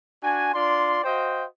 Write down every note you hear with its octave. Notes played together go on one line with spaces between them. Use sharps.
D4 F#4 G#5
D4 F4 D5 C6
F#4 C5 D#5 F5 G5